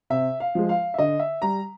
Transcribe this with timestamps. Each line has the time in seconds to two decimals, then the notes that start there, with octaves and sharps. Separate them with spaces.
0.10 C3 E5
0.40 F5
0.55 F3 G#3
0.69 F5
0.94 E5
0.98 D3 D#5
1.20 E5
1.42 G3 A#5